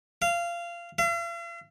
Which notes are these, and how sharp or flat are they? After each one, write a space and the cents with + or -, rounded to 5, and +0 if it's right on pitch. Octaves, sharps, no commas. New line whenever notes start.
F5 -20
F5 -45